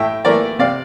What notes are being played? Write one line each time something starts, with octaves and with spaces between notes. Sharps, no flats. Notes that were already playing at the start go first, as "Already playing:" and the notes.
Already playing: A2 E5 G5
E3 A3 A#4 D5
C3 D5 F5